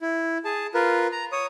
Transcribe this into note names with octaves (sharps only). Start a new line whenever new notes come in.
E4
G#4 A5
F4 A#4 B4
A#5
C#5 D#6